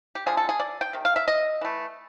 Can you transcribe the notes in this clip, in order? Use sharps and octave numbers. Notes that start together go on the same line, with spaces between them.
G4
D3 F3 G#3 G#4
A4
G#4
D5
G5
C3 D#3
F5
E5
D#5
E3 A3